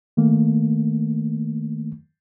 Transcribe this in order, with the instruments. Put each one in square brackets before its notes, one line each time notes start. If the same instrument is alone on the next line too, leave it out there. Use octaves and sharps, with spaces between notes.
[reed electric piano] D#3 A3 A#3